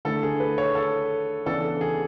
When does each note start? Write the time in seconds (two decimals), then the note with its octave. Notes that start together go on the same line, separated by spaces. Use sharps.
0.05 D3 A3 E4 A4
0.23 G#4
0.40 B4
0.58 C#5
0.75 A4
1.46 C#3 E3 B3 D4 A4
1.81 G#4